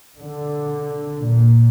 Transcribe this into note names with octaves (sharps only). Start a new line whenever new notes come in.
D3
A#2